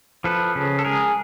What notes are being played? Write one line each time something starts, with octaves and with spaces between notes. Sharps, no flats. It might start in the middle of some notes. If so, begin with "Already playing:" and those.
F3 A4 B4
C#3
A4
G#3 G#4 A#4